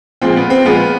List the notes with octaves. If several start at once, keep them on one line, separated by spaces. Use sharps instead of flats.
A#2 F3 G#3 C4
B3
C4
A#2 F3 G#3 B3